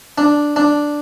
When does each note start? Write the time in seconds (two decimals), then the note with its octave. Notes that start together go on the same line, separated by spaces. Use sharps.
0.18 D4
0.56 D4